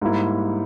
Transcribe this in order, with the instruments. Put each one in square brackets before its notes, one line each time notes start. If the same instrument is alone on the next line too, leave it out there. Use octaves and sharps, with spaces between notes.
[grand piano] G#2 G3 A#3 E4